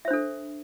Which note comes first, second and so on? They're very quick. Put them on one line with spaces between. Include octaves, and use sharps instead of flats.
E5 C5 D4 A4